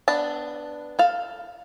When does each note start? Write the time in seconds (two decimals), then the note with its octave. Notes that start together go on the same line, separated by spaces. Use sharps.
0.08 B3 D4 A5
0.99 A4 F5